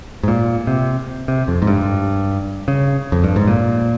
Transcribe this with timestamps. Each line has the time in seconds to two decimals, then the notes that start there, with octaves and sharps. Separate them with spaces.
0.23 G#2
0.28 A#2
0.67 C3
1.28 C3
1.48 F2
1.62 G#2
1.67 G2
2.68 C#3
3.12 F2
3.24 G2
3.36 G#2
3.48 A#2